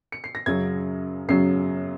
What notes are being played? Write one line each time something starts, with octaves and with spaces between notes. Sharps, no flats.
C#7
C7
A#6
F#2 C#3 F#3 G#6
F#2 C#3 F#3 C7